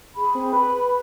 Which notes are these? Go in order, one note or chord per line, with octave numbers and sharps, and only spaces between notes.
G#4 B5
C4
B4 B5